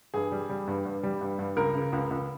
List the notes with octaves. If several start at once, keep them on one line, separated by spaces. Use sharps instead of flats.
G2 G#4
G3
G3
G2
G2
G3
G2
G2
C#2 A#4
C#3
C#2
C#2